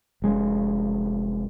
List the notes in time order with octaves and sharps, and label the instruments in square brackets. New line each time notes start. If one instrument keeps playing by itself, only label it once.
[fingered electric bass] F1 G#3 C#4